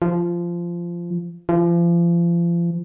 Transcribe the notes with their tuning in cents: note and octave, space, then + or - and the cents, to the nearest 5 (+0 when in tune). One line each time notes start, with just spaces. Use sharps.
F3 -15
F3 -35